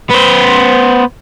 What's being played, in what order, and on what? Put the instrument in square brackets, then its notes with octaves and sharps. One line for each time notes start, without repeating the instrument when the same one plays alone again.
[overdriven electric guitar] B3 C5